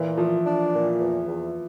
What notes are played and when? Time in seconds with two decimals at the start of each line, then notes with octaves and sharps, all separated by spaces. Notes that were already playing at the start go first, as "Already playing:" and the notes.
Already playing: A#2 E3
0.18 F3 A3
0.45 D4
0.73 A#2
1.00 E2
1.27 E2